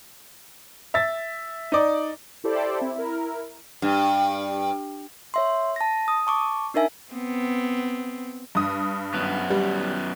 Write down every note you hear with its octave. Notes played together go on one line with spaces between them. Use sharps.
E5 A6
D#4 D5
E4 G4 A4 C5 D5
C4 E4
E4 A#4
G2
C#5 E5 C6
A5 A#6
D#6
A5 C#6 D6
D4 D#4 A#4 E5 G#5
B3 C4
G2 D#6
F#2 B3
G3